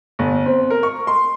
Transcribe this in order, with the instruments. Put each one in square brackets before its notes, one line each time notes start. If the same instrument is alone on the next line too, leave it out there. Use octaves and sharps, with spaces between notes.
[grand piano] G1
C4
A#4
C#6
C6